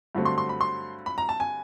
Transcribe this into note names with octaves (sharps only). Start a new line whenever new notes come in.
G2 D3 F#3 A3 C4
C6
C6
B5
C6
B5
A#5
A5
G#5